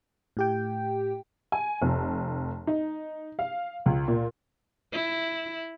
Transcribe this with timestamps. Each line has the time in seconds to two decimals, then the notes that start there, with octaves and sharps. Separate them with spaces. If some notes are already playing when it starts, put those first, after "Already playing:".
0.37 A2 G4 G5
1.52 G#5
1.82 F1
2.67 D#4
3.39 F5
3.86 C#2
4.08 A#2
4.92 E4